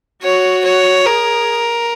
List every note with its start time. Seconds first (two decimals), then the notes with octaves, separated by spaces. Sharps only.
0.23 F#4 C#5
0.64 C#5
1.05 G#4 A#4